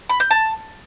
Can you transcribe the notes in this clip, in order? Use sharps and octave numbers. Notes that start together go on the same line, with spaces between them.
B5
G6
A5